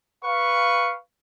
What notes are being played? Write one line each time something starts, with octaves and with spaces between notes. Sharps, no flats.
B4 F5 C#6